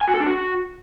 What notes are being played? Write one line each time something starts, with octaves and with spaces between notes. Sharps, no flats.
G#5
F#4
A4
D4
F#4